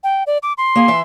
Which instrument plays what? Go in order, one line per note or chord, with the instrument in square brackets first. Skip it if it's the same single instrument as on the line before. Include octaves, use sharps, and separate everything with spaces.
[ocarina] G5
D5
D6
C6
[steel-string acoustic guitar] A#3 G#4
E3 E5